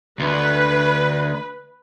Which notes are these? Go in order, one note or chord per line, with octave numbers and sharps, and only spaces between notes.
D2 B4